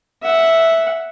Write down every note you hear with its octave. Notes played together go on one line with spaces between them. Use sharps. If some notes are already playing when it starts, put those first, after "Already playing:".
E5 F#5